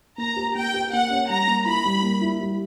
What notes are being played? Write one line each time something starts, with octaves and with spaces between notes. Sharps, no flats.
A#3 A#5
G4
A#3 G5
G4
A#3 F#5
C#4
G3 A#5
A#3
E4 B5
G3
A#3
E4
G3